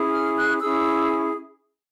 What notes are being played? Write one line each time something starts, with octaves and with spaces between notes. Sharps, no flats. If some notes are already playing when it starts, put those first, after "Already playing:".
Already playing: C#4 E4 G#4
F6
F#6
C#4 E4 G#4 E6